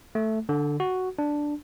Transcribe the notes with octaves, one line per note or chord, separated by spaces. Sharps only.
A3
D3
F#4
D4